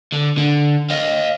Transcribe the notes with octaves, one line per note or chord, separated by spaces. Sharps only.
D3
D3
D#5 F5